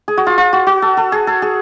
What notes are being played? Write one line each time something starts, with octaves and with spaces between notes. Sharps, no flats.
G#4
F#4
F4
F4
F#4
F#4
A4
A4
G#4
A4
G#4